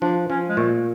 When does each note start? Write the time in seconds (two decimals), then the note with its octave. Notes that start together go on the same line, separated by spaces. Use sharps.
0.02 F3 D4
0.30 F3 C#4
0.49 G#3
0.57 A#2 A3